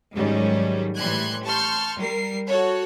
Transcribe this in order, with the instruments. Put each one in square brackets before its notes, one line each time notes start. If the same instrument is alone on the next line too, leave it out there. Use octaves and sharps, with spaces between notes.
[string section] G#2 D#3 F#3 G3 C#4
A2 E3 G3 C6 F#6 G#6
A5 C6 C#6 F6 G6
G3 A#4 C7
F#4 A4 C#5